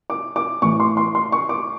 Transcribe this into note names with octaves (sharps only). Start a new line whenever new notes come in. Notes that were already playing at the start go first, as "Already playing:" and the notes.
D6
D6
A2 E3 C#6
C6
C6
C6
C#6
D6